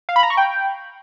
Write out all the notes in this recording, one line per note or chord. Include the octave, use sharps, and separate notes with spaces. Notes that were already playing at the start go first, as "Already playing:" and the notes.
F5
B5
A#5
C#6
G5